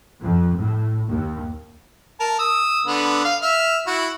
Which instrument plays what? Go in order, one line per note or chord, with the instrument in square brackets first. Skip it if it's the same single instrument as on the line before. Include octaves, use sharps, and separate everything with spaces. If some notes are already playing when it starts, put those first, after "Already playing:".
[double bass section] F2
A2
D#2
[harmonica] A#4 A5
D#6 E6
D3 B3
F5
E5 F6
E4 F#4